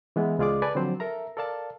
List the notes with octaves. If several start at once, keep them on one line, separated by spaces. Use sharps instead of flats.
E3 G#3 B3 E4
C#2 G#3 F4 G#4 D5 D6
A4 B4 D5 G#5 A5
D3 F3 F#3 C4 C5
A4 A#4 E5 A#5
A4 A#4 D5 F5 A5